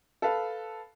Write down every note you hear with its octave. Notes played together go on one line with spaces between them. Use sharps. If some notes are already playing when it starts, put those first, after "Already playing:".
A4 B4 F5